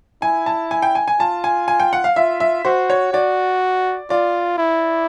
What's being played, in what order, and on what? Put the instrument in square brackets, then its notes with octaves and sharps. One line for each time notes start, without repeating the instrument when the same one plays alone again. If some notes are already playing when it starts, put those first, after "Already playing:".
[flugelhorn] E4 [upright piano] G#5
[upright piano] A5
G#5
G5
G#5
G#5
[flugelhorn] F4 [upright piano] A5
[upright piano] G#5
G#5
G5
F#5
F5
[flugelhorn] F4 [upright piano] E5
[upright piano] E5
[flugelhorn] F#4 [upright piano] C5
[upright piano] C#5
[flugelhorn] F#4 [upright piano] D5
[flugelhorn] F4 [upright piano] D5
[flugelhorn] E4